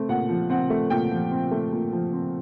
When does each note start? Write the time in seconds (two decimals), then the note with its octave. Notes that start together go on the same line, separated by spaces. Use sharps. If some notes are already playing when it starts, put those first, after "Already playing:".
Already playing: A3 C4
0.09 A#2 F#5
0.29 F3
0.50 C4 F#5
0.70 A3
0.90 A#2 G5
1.11 F3
1.31 C4
1.51 A3
1.73 A#2
1.92 F3
2.13 C4